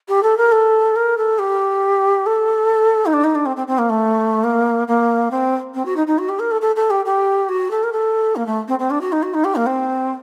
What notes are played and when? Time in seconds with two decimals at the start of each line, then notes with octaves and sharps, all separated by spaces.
0.08 G4
0.22 A4
0.37 A#4
0.51 A4
0.96 A#4
1.17 A4
1.39 G4
2.26 A4
3.06 D#4
3.13 D4
3.24 D#4
3.35 D4
3.46 C4
3.56 C4
3.67 C4
3.78 A#3
3.89 A3
4.43 A#3
4.87 A#3
5.31 C4
5.74 C4
5.85 F#4
5.96 D#4
6.07 D#4
6.18 F#4
6.29 G4
6.39 A#4
6.51 A4
6.61 A4
6.76 A4
6.90 G4
7.05 G4
7.49 F#4
7.70 A4
7.83 A#4
7.92 A4
8.36 A#3
8.46 A3
8.68 C4
8.79 C4
8.90 D4
9.01 F#4
9.12 D#4
9.22 F#4
9.34 D#4
9.44 G4
9.55 A#3
9.66 C4